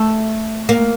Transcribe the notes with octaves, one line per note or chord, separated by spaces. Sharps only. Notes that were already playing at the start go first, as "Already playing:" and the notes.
Already playing: A3
A#3